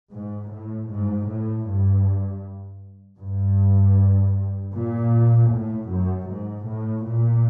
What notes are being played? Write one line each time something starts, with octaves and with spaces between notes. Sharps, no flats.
G#2
A2
G#2
A2
G2
G2
A#2
A2
F#2
G#2
A2
A#2